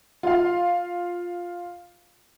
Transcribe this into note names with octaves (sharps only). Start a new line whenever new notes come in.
F4 F5